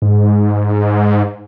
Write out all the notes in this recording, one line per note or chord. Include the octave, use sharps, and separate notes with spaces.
G#2